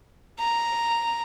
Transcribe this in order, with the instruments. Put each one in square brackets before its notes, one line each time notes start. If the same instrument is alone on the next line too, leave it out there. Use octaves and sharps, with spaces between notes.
[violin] A#5